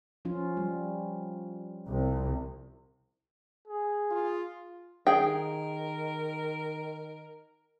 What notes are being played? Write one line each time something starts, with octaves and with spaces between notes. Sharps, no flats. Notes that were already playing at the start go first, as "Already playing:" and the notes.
F3 C#4 F4
G3
C2
G#4
F4
D#3 G#4 A#4 G5